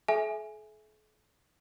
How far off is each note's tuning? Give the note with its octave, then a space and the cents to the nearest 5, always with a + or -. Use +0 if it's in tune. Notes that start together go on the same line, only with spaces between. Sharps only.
A4 -45 E5 +0 G#5 +0